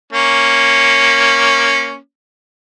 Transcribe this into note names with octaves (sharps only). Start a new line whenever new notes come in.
A#3 C#4